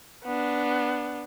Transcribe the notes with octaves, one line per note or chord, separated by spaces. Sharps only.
B3 D4